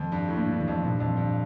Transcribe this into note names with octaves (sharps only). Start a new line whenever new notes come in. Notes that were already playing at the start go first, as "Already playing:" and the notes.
Already playing: F2 D#3
G2 D4
A2
G2 A#3
G2
D#3
F2
G2 A#2
F2
C4
G2